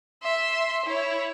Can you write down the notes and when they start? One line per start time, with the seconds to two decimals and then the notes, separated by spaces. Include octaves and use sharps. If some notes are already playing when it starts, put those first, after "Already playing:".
0.23 E5 C6
0.85 E4 C#5